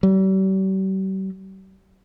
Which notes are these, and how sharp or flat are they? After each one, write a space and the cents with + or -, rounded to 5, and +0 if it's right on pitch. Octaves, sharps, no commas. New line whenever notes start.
G3 -45